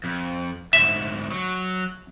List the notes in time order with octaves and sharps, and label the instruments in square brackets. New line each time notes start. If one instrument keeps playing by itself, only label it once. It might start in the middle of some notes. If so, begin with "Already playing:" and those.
[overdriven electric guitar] F2
[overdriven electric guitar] D2 G#2 [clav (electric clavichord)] E5
[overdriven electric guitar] F#3